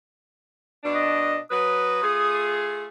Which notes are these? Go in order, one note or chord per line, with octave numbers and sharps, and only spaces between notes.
B2 D4
D#5
F#3 B4 D#6
A3 F4 G#4